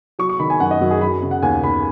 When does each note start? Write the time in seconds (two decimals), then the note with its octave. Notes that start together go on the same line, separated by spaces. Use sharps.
0.19 F#3 C#6
0.29 C#6
0.39 D#3 B5
0.50 G#5
0.60 F#2 F#5
0.71 D#5
0.81 F#2 F#4
0.91 G#4
1.01 F#3 B5
1.22 C#3
1.31 F#5
1.42 D#2 G#5
1.63 D#2 B5